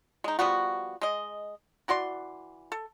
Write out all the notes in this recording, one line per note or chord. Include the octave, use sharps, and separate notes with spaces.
G#3 D#4
F3 G3 B3 F#4
G#3 D#5
E3 F#4 D5 C6
A4